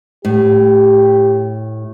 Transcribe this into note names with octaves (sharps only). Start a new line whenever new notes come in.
A2 G4